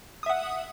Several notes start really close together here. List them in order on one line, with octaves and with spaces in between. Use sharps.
D#6 E5 F#5